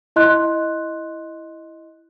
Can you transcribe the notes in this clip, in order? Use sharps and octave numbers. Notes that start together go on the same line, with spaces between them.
E4 D#5 C6 F#6